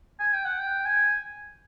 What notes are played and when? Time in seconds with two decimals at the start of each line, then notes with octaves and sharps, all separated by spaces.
0.20 G#5
0.33 G5
0.45 F#5
0.59 G5
0.85 G#5